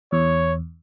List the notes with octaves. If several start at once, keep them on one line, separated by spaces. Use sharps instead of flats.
E2 C#5